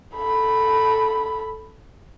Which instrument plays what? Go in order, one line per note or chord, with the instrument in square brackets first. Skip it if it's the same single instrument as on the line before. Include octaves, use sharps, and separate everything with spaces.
[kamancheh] A4 B5